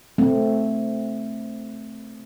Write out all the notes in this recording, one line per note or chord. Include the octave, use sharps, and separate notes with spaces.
A3 C4